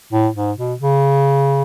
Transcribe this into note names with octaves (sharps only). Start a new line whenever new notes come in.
A2
G#2
B2
C#3